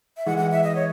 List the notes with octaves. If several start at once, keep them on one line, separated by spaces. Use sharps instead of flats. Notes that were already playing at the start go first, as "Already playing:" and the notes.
E5
E3 G#3 F#5
F#5
E5
D#5
C#5